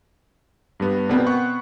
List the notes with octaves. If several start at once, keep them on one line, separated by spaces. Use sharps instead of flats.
G2 G3 B3
B2 B3 C4 A#4 D5
F#5 C#6 F#6